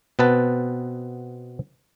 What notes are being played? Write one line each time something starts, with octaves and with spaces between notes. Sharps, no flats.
B2 B3 C4 B4 A5